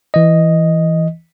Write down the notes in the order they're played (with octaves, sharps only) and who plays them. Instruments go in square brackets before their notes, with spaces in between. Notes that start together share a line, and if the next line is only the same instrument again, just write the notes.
[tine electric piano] E3 D#5